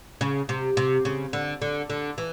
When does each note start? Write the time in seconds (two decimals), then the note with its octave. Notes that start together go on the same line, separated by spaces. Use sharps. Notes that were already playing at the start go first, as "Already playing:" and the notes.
0.21 C#3
0.49 C3
0.77 C3
1.05 C#3
1.33 D3
1.62 D3
1.90 D3
2.18 E3